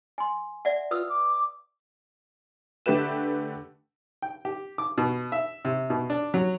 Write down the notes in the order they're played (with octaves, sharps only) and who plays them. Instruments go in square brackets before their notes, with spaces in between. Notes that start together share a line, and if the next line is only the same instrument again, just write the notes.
[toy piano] G#5 C6
D5 E5 F#5
[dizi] F4 [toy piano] B4 D#6 E6
[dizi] D6
[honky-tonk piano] D3 A3 G4 B4 E7
[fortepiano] G5
G4
D6
B2
E5
C3
B2
D4
F#3